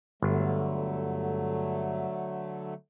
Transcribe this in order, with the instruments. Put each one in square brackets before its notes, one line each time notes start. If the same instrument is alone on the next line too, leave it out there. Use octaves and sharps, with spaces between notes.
[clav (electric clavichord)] G1 [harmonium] D3 F#3 A3